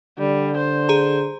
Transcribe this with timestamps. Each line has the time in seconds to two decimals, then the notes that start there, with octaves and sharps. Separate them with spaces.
0.19 D3 G3
0.56 C5
0.89 G#4 A#5